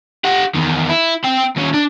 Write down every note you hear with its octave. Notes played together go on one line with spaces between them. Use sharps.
G4 F#5
E2 D#3
E4
C4 G5
D#2 C#4
D4